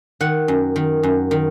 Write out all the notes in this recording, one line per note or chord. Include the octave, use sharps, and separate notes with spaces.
D#3 F#5
F#2
D#3
F#2
D#3